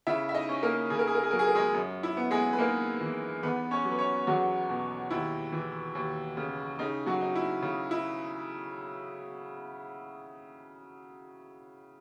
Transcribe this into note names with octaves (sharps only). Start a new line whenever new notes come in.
C#3 E4 E5
E5
D#4 D#5
C#4
A#3 A#4
C#3 G#4
A#4
G#4
A#4
G#4
F#3 A#4
G#4
A#4
G#3 G#4
F#2
E4
B3
G#3 G#4
B4
A#3 D#4 A#4
E3
E2 B3 B4
C#4 C#5
F#3
B4
C#4 C#5
E2 F#3 F#4
B2
D#2 E4
E3
D#2
C#3
C#3 D#4
F#3 F#4
D#4
E4
C#3
E4